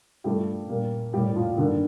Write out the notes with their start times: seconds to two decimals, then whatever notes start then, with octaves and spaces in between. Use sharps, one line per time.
0.24 G2 F3 G3 A3 G4
0.69 A#2 G3 A#3
1.13 A2 G3 A#3 G4
1.36 F3 F4
1.57 G2 D3 D#3 A#3 D4